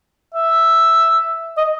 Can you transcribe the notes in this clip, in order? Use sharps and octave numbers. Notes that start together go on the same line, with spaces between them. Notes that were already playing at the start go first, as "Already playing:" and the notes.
E5
D#5